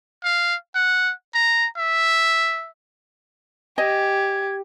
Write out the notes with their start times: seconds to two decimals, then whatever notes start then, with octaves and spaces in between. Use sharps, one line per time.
0.24 F5
0.75 F#5
1.35 A#5
1.78 E5
3.78 G4 D#5 G#5 G#6